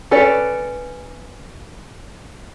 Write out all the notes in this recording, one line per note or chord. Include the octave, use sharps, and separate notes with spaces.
C#4 A4 B4 C#5 D5